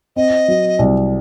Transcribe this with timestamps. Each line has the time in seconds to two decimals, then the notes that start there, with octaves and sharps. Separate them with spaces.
0.16 C4 D#5
0.48 F#3
0.79 C2